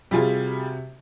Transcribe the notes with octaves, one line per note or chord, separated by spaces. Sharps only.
C3 G3 F4 F#4 G#4